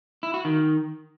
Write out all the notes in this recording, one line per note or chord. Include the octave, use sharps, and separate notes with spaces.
E4
F#4
D#3